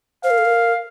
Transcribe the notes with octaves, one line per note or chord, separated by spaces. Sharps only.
C5 F5
A#4
A4
A#4